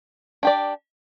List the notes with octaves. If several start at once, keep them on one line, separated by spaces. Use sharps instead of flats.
D4 G4 D5